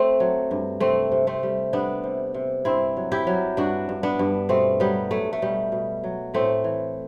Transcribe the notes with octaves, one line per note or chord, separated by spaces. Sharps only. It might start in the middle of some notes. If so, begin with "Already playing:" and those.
Already playing: A3 C4
F#3
G2
C3 A3 C4
C3
A3 C4
G3
G3 B3 D4
C3
C3
G2 C4 E4
F#3
E4 G4
F#3
G2 D4 F#4
G2
B3 D4
G2
B2 A3 C4
F#3 G3 B3
F#3 A3
A3
B2 G3
B2
F#3
A2 A3 C4
E3